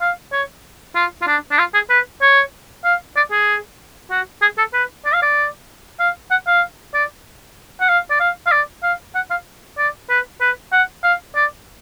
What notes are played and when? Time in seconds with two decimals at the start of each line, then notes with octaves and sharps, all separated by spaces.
0.01 F5
0.32 C#5
0.95 F4
1.22 F4
1.27 D4
1.51 D4
1.58 F4
1.74 G#4
1.90 B4
2.22 C#5
2.85 F5
3.16 D5
3.32 G#4
4.11 F#4
4.42 G#4
4.58 A4
4.74 B4
5.05 D5
5.14 F5
5.22 D5
6.00 F5
6.31 F#5
6.47 F5
6.94 D5
7.80 F#5
7.89 F5
8.10 D5
8.20 F5
8.46 F5
8.51 D5
8.83 F5
9.15 F#5
9.31 F5
9.78 D5
10.10 B4
10.41 B4
10.72 F#5
11.04 F5
11.35 D5